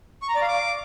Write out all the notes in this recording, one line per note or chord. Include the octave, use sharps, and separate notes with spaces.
C#6
A#5
D5
F5
D6